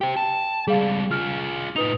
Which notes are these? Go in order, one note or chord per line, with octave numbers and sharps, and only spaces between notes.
G4 C5 G5
A5
C#2 G3 G#4 F5
F4 G#4 F6
A2 D#4 B4 D#6 F7